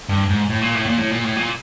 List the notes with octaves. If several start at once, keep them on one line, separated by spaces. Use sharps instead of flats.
G2
G#2
A2
A#2
A2
A#2
A2
A#2
A2
A#2